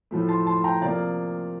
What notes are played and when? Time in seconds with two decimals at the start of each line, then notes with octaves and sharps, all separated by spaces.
0.11 A2 F3 A3
0.29 A5 C6
0.47 A5 C6
0.64 G5 A#5
0.82 C3 F3 A#3 D5 F5